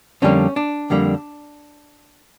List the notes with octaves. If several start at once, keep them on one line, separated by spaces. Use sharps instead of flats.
F2 D3 G3 A#3 C#4
D4
F2 D3 G3 A#3